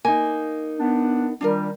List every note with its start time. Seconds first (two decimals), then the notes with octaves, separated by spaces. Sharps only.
0.05 A#3 D#4 G#5
0.79 B3 D4
1.41 D#3 G3 D4 F4 A#4